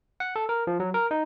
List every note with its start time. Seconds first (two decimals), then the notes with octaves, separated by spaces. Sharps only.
0.20 F#5
0.36 A4
0.49 A#4
0.67 F3
0.80 F#3
0.94 A#4
1.11 D#4